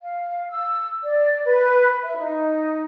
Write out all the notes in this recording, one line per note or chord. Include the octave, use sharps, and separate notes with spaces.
F5
E6
D5
B4
E5
D#4